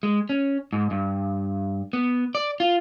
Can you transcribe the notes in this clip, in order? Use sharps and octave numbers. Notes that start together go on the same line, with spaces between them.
G#3
C#4
G#2
G2
B3
D5
F4